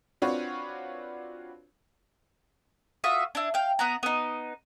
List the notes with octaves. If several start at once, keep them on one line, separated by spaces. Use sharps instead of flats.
C4 D4 F4 F#4 B4 C#5
F4 F#4 E5 D#6
D4 E4
F5 G5
B3 F#5 A#5
B3 D#4